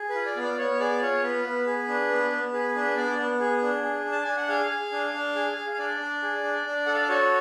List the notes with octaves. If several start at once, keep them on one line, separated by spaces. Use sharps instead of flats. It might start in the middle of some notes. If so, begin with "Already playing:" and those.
Already playing: G#4
B4
F4
D5
B3
D5
B3 C#5
G#4 D5
F4 C#5
B3 B4
B3
G#4
D4
B3
B3
G#4 B4
D4 B4
B3 D5
B3
G#4
D4
G#4
D4
A5
D4 G#5
F#5
G#4 F5
G#4
D4
D4
G#4
G#4
F5
D4 D5
D4
G#4
D4
D4
A4 F#5
F5
D5
F#4 C#5